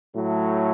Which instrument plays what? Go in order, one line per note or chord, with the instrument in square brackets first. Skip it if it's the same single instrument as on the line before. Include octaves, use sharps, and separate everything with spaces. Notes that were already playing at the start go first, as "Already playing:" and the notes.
[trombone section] A2 F#3 A3